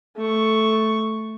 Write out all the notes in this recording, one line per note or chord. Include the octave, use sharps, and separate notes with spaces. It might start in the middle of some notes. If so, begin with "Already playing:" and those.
A3 C#6